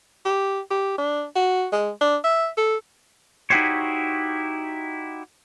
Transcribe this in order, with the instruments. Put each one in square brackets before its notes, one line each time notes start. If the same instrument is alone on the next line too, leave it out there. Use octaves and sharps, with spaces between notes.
[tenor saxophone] G4
G4
D4
F#4
G#3
D4
E5
A4
[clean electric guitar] D#4 E4 F#4 G4 C5 C#5